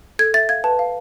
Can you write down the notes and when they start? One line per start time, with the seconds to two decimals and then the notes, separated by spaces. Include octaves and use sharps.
0.19 A4 G#6
0.34 E5 A6
0.49 F5 G#6
0.64 B4 A5
0.79 F5